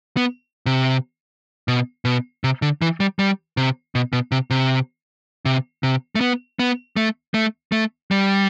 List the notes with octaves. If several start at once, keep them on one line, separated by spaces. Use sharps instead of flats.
B3
C3
B2
B2
C3
D3
E3
G3
G3
C3
B2
B2
C3
C3
C3
C3
A3
B3
B3
A3
A3
A3
G3